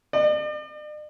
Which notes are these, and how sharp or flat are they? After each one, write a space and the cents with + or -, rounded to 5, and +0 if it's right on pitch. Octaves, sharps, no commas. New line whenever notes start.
D5 +45